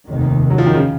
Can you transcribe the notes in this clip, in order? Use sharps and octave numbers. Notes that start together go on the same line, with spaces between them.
F1 D#2 D#3
F#3
F3
D#3
C#3